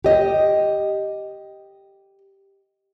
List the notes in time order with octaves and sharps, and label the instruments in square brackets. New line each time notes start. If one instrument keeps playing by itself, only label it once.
[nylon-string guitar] G4 D#5